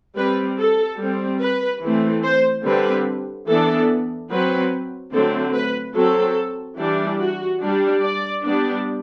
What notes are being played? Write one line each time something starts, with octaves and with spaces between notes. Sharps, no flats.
G3 C4 B4
A4
G3 C4
B4
E3 A3 C4
C5
D3 G3 C4 B4
E3 B3 D4 A4
F#3 C4 B4
D3 F#3 A3 C4 A4
B4
F#3 C4 A4
E3 G3 D4
F#4
G3 D4
D5
G3 B3 D4